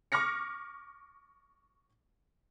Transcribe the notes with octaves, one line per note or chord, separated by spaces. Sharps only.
C#6 D6 F6 A#6 C#7